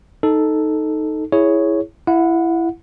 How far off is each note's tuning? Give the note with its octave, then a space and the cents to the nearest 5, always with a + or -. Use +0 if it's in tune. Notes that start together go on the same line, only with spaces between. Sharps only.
D#4 +0 A4 +0
E4 +0 G#4 +0 C#5 +0
E4 +15 F#5 -25